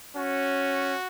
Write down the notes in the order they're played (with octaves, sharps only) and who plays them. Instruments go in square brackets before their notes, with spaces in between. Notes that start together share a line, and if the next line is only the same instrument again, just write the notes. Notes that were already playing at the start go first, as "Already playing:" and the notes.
[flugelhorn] C#4 [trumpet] F#4